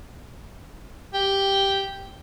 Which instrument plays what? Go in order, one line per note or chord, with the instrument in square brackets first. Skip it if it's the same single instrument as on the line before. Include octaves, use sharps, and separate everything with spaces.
[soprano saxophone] G4